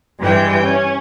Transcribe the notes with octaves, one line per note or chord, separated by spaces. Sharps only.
G2 E3 G3 G#3 G5
C#4